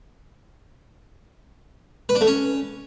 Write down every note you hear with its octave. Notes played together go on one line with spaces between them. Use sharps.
B4
D4
A3
C#4